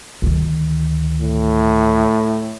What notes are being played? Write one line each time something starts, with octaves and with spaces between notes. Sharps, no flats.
D2 D#3
A2